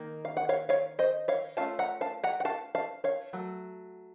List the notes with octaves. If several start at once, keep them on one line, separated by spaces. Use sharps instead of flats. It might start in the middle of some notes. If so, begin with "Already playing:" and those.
Already playing: D#3 A#3 D#4
F5
F#5
C#5 F5
C#5 F5
C5 D#5
C#5 F5
A3 C#4 F4 F5 A5
F#5 A#5
F5 A5
F#5 A#5
F#5
F5 A5
F5 A5
C#5 F5
F#3 A3